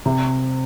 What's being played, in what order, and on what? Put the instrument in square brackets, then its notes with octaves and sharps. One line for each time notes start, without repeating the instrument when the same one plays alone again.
[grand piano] C3